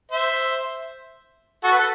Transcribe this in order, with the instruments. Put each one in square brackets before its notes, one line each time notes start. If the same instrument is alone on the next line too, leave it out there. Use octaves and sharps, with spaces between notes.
[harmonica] C5 E5
F#4 A4
B4
A4